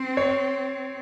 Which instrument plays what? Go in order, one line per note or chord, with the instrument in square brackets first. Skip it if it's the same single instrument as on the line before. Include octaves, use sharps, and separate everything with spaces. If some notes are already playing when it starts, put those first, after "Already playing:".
Already playing: [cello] C4
[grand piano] C#5